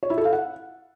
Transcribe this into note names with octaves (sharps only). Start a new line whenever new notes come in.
C#5
E4
A4
F5
F#5